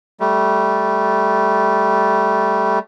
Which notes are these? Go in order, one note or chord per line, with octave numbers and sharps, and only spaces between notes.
G3 A3